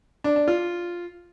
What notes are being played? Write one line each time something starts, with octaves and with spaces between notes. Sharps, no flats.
D4
D4
F4